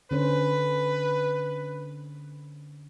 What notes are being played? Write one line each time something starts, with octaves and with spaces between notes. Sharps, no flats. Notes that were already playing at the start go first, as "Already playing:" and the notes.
D3 C#4 B4 C5